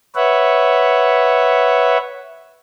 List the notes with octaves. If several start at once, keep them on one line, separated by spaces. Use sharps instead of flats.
B4 C#5 E5 F#5